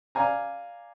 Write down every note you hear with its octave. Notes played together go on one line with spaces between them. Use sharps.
D5 F5 G#5 A#5